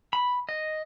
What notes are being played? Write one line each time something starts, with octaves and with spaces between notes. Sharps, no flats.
B5
D#5